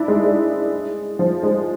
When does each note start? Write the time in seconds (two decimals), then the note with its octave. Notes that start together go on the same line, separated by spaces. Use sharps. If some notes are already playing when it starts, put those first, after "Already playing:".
Already playing: D4 E4
0.08 G#3
0.23 G#3
1.19 F3
1.43 G#3